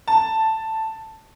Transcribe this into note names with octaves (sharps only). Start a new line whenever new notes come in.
A5